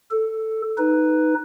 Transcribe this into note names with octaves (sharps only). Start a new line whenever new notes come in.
A4
D#4 B4